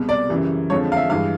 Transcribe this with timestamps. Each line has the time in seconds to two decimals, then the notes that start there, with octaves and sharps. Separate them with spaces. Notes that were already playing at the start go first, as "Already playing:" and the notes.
Already playing: C2 B2 G#3
0.09 D5
0.29 F#2 C#3 E3 G3
0.70 F2 D3 F3 G#3 C#5
0.92 F5
0.97 E5
1.10 G2 E3 G#3 F5